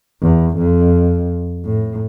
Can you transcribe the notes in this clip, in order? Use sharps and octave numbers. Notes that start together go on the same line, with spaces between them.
E2
F2
A2